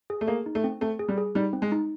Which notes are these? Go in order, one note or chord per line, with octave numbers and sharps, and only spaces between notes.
G#4
A3
A#3 G#4
D#4
A3
C4
A3 C4
G#4
G3
G#4
G3 D#4
C4
G#3
D#4